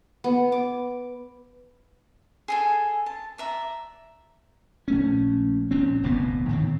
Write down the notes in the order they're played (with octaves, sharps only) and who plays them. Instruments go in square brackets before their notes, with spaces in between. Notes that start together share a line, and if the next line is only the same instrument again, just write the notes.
[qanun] B3
D6
[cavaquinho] G#4 A4 G#5
A5
D5 E5 A#5
[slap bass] A#1 A3 C#4
A#1 A#2 C4 C#4
F1 D2 A#2 B3
A2 D#3 C4